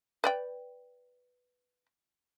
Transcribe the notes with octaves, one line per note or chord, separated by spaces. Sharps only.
B4 D5 G5